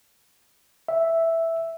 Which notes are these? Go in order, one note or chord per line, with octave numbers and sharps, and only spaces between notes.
E5